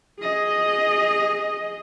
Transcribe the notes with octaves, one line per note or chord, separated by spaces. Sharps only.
G#4 D#5